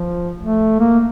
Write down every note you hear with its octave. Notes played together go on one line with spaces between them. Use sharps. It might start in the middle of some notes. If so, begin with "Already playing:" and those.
Already playing: F3
A3
A#3